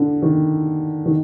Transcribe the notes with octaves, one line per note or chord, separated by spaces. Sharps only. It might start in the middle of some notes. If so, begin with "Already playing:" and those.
Already playing: D3
D#3
D#3